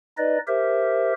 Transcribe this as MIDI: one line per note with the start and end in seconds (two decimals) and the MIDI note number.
0.18 0.39 63
0.18 0.39 71
0.18 0.39 74
0.18 0.39 75
0.47 1.13 67
0.47 1.13 70
0.47 1.13 72
0.47 1.13 76